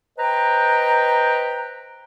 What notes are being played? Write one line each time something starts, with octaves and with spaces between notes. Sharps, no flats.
B4 C5 D#5 G5 A#5